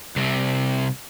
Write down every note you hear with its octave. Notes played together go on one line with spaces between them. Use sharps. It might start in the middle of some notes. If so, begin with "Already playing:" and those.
C2 C3